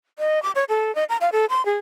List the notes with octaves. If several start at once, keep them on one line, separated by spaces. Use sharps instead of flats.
D#5
D6
C#5
A4
D#5
A#5
F5
A4
C6
G#4